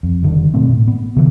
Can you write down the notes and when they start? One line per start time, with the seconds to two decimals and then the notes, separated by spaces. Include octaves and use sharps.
0.03 F2
0.23 F1 D3 D#3 G3
0.54 G#2 B2 A3 C4
0.70 A2
0.88 B3
1.16 C#3 E3 F3